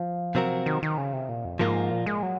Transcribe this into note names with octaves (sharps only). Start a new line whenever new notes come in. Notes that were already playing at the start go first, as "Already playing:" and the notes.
Already playing: F3
C3 F#3 C4 F#4 A#4
D#3
D#3
C#3
C3
A#2
F2
G#2 F3 A#3 F4 A#4
A#2
G#3
F#3